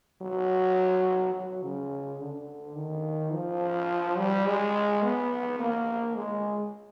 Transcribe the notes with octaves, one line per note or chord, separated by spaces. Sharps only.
F#3
F#3
C#3
D3
D#3
F3
G3
G#3
B3
A#3
G#3